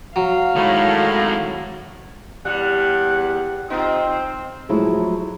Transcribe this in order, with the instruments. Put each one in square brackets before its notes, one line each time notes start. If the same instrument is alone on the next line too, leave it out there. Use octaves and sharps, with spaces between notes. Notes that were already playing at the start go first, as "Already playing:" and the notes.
[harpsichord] F#3 [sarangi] F5
[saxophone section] A2 [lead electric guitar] D#3 G#3
[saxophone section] E2 F#5 [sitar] G3
[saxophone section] C4 [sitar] D#4 F4
[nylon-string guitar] A2 F3 F#3 G#3 A3 E4